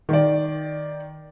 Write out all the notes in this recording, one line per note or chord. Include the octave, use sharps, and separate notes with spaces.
D#3 D5